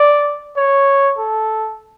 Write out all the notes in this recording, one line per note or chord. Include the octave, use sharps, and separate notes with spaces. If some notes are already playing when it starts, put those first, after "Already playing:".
Already playing: D5
C#5
A4